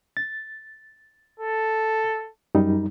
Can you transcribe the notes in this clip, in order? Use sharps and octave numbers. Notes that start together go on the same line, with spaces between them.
A6
A4
F#2 G3 D#4